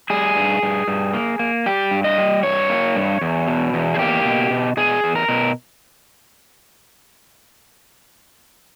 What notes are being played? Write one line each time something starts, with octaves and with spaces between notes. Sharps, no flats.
G3 G#4
G2
G2
G2
A#3
A#3
G3 G4
G2
D#5
G3
G2 C#5
A#3
G2
E2
B2
E2
G#4
A#3 G4
B2
B2
B2 G#4
E2
A#4
B2